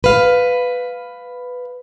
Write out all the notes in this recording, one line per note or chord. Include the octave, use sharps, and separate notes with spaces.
B4 F5